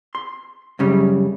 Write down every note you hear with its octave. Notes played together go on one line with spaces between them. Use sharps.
C6
F#2 C#3 G3